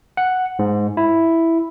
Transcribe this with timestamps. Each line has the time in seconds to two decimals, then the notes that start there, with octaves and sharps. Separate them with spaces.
0.17 F#5
0.59 G#2
0.97 E4